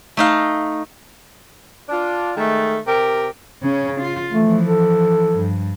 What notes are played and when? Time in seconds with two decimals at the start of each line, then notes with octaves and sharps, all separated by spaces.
0.17 A3 D#4 F5
1.89 D4 F4
2.37 D#3 G#3 A3
2.87 C3 G4 A#4
3.63 C#3 C#4
4.01 F4
4.32 E3 F3 A3
4.64 A4
5.37 G2